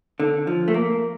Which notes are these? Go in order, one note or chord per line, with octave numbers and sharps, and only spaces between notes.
D3
F3
A3
A#3